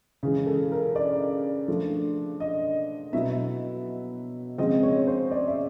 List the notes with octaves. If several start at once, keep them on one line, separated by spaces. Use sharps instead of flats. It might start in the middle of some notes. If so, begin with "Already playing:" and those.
C#3 E3 G#3 G#4
A4
A#4
D5
F3 A3 D4
D#5
B2 F#3 B3 E4 E5
C#3 F3 G#3 C4 D#5
C#5
C5
D5
E5